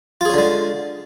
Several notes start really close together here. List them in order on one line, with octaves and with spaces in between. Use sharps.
F4 G#4 C#4 D3 G#3